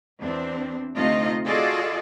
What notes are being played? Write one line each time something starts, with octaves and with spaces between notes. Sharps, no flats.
E2 C4 D4
D2 C3 A3 D#4 F4 D#5
F4 F#4 G#4 A4 D5 D#5